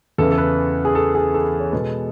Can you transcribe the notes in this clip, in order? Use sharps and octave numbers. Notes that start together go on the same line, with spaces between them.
E2 C#3 E3 A4
A4
B4
G#4
A4
G#4
A4
C#5
B2 G#3 B3 A4